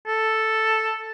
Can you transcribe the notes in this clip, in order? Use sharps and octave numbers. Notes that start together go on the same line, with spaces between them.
A4